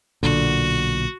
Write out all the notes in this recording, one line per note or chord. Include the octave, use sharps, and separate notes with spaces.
B1 A#2 D3 F#4